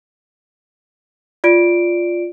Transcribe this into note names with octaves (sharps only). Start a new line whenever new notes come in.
F4 D5 D7